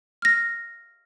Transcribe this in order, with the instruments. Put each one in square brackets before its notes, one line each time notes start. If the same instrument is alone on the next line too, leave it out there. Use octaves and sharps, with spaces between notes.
[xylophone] F6 A#6